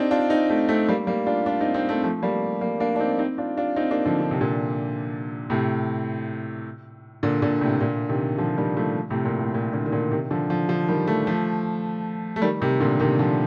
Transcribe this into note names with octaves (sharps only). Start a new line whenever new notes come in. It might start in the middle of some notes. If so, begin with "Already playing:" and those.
Already playing: C4 D4 D#4
D4 F4
C4 D#4
A3 C4
A3 C4
G3 A#3
G3 A#3
D4 F4
D4 F4
C4 D#4
C4 D#4
A3 C4
F3 A3
G3 A#3
G3 A#3
A#3 D4
D4
C4 D#4
C4 D#4
D4 F4
D4 F4
C4 D#4
A#3 D4
D3 F3
D3
C3
A#2 D3
A2 C3
A#2 D3
A#2 D3
A2 C3
A#2 D3
C3 D#3
D3 F3
D#3 G3
F3 A3
A2 C3
A#2
A2
A#2
A#2 D3
D#3
A#2 D3
C3 D#3
D3 F3
D3 F3
D3 F3
D#3 G3
F3 A3
F3 A3
A3
D#3 G3
C3 D#3
A#2 D3
C3 D#3
D3 F3